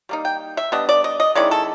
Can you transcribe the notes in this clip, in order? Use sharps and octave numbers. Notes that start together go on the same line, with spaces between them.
G3 A#3 D#4
G5
E5
G3 B3 D4 D#5
D5
D#5
D#5
D#3 G#3 C#4 E4 D5
A4